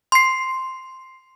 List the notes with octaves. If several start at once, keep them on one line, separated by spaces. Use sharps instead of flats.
C6 C7